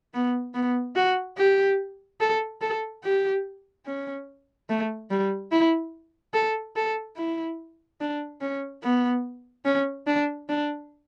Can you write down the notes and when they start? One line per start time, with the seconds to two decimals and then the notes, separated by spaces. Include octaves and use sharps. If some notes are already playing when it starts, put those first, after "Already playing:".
0.14 B3
0.54 B3
0.96 F#4
1.38 G4
2.21 A4
2.61 A4
3.04 G4
3.86 C#4
4.69 A3
5.11 G3
5.52 E4
6.34 A4
6.76 A4
7.17 E4
8.01 D4
8.41 C#4
8.83 B3
9.65 C#4
10.07 D4
10.49 D4